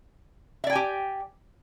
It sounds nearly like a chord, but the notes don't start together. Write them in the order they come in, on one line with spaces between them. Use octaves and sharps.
E5 D5 G5 G#5 G4